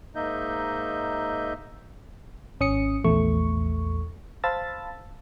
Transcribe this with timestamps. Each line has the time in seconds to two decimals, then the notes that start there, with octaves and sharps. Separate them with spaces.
0.15 G#2 A#3 D#4 D#5 E5 G6
2.60 G#1 C#4 D#6 C#7
3.04 A#1 E2 A3 C#6
4.44 C5 F5 A5 B5 E6 A6